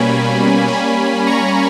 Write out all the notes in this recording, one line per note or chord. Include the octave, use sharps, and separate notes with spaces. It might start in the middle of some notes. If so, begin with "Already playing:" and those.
Already playing: B2 G3 A#3 C#4 G#5 B5
G3 A#3 C#4
A#5 C#6